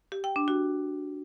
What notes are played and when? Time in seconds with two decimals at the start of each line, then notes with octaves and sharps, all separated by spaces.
0.12 G4
0.24 G5
0.36 D4
0.48 F#4